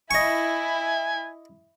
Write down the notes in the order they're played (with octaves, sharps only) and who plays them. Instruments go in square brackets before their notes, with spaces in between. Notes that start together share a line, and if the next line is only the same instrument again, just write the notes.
[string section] E4 [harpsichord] D#5 C#6 [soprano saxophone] G#5